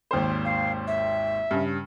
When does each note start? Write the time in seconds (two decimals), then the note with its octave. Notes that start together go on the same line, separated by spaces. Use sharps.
0.11 G#1 D#2 C5
0.45 F5
0.87 E5
1.51 G2 C#3